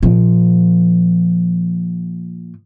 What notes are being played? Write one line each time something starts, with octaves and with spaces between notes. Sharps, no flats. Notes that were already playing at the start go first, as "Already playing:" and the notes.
A#2 F3